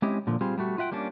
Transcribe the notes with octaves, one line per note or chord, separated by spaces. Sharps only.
G#3 C4 C#4 E4 G4 D#5
A#2 D3 F3
G3 C4 F4 G#4
G3 A3 F#4
F4 E5 F#5 G5
G3 A#3 C#4 D4